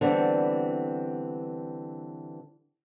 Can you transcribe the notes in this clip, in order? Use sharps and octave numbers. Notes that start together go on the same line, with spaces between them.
D3 E3 G3 B3 C4